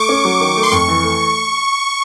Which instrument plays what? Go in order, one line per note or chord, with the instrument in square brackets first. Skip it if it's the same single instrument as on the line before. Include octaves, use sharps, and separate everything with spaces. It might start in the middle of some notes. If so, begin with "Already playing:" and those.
Already playing: [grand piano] A3 [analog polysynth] C#6 D6
[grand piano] C#4
F#3
D#3
A3
[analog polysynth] C6
[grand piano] F2 [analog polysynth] C#6
[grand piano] E3
A3